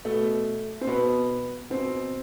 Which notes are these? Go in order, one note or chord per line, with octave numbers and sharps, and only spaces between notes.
B2 A3
C4
B2 B3
B2 C4